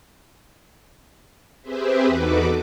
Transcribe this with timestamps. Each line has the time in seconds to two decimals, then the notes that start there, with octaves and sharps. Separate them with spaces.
1.62 C4 G4 G#4 B4 C5 E5
2.06 E2 D#4 F#4 A4 B4 D6